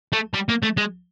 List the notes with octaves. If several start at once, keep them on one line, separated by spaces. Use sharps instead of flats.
A3
G3
A#3
A3
G#3